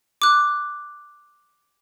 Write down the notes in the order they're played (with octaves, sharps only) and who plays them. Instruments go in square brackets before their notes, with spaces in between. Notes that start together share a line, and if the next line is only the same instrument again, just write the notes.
[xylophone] D6 F#6